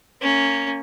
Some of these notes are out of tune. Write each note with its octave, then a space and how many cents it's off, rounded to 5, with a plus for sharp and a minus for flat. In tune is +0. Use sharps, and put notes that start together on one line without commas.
A#3 -20 C#4 +0